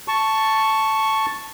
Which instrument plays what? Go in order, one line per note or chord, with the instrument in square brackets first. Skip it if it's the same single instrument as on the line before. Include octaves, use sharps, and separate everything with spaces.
[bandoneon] A5 C#6